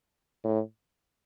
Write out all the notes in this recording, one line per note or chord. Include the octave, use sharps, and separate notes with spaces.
A2